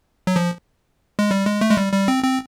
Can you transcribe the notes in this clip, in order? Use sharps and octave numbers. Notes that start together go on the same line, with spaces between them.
F#3
F3
G#3
G3
G#3
A3
G#3
G3
G3
C4
C4